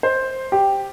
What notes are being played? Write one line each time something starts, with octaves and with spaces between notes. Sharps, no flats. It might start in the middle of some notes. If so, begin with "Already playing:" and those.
C5
G4